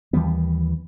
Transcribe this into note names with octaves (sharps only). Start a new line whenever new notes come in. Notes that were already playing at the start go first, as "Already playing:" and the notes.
D#2 E3 G3 B3